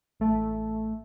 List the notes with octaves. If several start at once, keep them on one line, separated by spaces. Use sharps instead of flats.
A1 A3